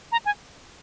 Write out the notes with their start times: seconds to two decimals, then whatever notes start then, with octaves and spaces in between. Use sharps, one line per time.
0.12 A#5
0.26 G#5